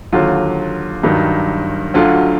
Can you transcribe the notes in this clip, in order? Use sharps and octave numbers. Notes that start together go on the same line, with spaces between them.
D#2 D3 F#3 F4
G2 D#3 F#3
D2 D3 F#3 F4